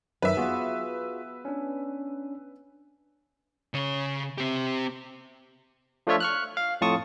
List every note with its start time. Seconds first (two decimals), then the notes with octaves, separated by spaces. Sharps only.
0.22 F#2 D#3 B4 E5
0.37 B3 F4 F#4 G#4
1.45 C#4 D4
3.74 C#3 C#5
4.38 C4 G4
6.07 F3 A3 D4 F4 C#5 E5
6.20 C#6 F6 F#6
6.57 F5
6.81 F2 A2 F4 A5 C#6 D#6